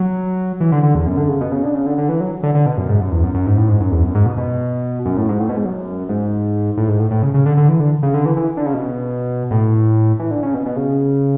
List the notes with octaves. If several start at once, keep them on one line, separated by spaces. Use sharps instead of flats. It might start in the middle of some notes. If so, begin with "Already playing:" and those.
Already playing: F#3
E3
D3
D3
E2
F#2
D3
C#3
B2
C#3
D3
C#3
D3
D3
E3
F#3
D3
D3
B2
F#2
G#2
F#2
E2
F#2
F#2
G#2
A2
G#2
F#2
E2
F#2
G#2
B2
B2
F#2
A2
G#2
A2
B2
G#2
F#2
G#2
A2
G#2
A2
A2
C#3
C#3
D3
D3
E3
D3
C#3
D3
E3
E3
D3
C#3
B2
A2
E3
D3
C#3
B2
B2
C#3